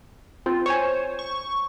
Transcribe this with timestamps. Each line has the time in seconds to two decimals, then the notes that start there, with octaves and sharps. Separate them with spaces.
0.46 C4 F4
0.66 C5 C#5 G#5
1.19 C#6